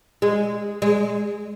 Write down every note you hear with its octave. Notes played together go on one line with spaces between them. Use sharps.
G#3
G#3